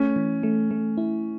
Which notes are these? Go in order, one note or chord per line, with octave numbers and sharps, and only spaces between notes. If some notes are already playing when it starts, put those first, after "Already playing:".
Already playing: A3 C#4
E3
A3
A3
E4